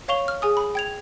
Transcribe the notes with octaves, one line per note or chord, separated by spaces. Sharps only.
C#5 F5 C#6 F7 G7
F6
G#4 G#5 D#6
B5
G5 G#6 F7